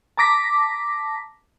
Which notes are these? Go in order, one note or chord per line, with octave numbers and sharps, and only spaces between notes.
A5 A#5 D6 A#6 B6